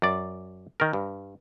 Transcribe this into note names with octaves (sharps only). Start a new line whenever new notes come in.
F#2 D5
D#3 A#4
G2